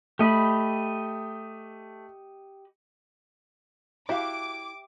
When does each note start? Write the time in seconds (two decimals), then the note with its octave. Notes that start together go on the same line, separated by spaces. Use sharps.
0.19 A3 G4 D#5 B5
4.09 E4 F#4 G4 E5 F5 A5 D6